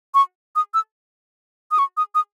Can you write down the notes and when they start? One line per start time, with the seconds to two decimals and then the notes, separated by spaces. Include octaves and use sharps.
0.14 C#6
0.56 D#6
0.74 E6
1.71 D#6
1.79 C#6
1.97 D#6
2.15 D#6